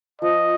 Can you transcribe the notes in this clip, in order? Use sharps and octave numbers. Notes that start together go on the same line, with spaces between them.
F3 D#5